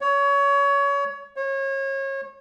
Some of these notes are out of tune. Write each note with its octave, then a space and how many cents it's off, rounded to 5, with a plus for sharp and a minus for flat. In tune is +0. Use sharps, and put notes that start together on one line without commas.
C#5 +25
C#5 -30